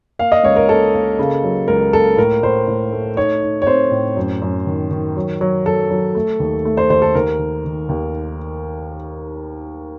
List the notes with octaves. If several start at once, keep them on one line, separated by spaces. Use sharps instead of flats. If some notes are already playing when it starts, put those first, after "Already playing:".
A#3 F5
D#5
C#2 C#5
A#4
A#3 A4
A#3
C#3
F#3
C#2 A#4
A#3 A4
A2 A#4
A2 C5
A2
A3
D#4 C#5
D#4
C#5
C4 C5
A2
F#2
F#2
D#3
D#3
F#3
F#3
F#3 A4
F#3
A3
D#2
A3
C5
D#2 C5
A4
D#2 A#4
D#3
D#3
D#2